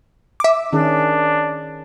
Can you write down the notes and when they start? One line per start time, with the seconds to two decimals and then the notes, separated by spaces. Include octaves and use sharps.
0.40 E5 D6
0.73 D#3 C#4 D4 G#4